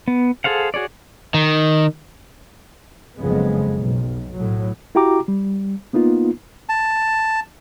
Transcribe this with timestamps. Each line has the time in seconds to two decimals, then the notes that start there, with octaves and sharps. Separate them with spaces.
0.08 B3
0.44 G#4 A4 C5 F5 F#5
0.74 F#4 G#4 C#5 D5
1.34 D#3
3.19 F#1 F2 C#3 G#3 B3
3.77 B1
4.32 A2 F#3
4.95 E4 F#4 G4 G5 A#5 D6
5.28 G3
5.93 A#3 B3 D#4 F4
6.69 A5